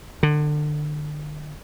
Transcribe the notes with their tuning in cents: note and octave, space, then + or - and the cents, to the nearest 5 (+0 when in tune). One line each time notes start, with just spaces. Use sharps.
D3 +30